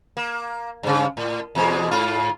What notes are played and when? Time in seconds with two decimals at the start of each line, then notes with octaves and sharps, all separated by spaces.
0.17 A#3
0.83 G2 C#3
1.17 A2
1.55 E2 B2 G#3
1.91 G#2 F4